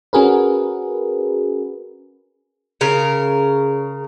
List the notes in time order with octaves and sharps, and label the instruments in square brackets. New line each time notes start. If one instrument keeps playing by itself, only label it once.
[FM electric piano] C#4 F#4 G#4 A#4 B4
[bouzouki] C#3 A#4